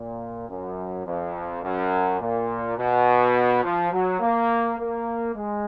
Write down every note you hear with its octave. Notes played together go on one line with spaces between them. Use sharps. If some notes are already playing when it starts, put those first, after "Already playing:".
Already playing: A#2
F#2
F2
F#2
A#2
B2
F3
F#3
A#3
A#3
G#3